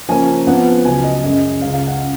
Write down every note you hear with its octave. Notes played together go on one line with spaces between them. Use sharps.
C#3 F3 A#3 C#4 G#5
F2 F3 B3 F#5
C#2 C#3 F#3 G#5
D#5
F#2 C#3 G#3 C#4
C#2 C#3 G#3 C#4 F5
F5
F#5
C#3